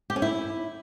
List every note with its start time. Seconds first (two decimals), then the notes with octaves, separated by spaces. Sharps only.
0.10 G4
0.16 C#4
0.22 E4